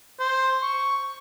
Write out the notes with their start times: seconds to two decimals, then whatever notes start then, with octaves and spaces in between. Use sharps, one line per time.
0.19 C5
0.62 C#6